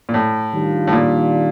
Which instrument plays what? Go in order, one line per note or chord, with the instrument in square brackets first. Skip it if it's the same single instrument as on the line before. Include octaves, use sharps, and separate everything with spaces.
[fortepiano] A#2
A2
[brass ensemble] D#3 G3 D4 F4
[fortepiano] A2
A#2